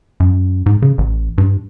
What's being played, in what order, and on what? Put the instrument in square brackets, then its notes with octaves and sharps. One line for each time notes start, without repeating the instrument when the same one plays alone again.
[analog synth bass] F#2
G#2
C#3
A1
G2